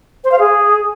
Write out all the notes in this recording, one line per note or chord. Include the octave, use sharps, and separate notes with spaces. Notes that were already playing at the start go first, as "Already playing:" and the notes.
C5
F5
G#4